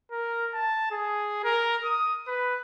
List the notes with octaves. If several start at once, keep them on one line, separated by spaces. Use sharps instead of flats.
A#4
A5
G#4
A#4
D#6
B4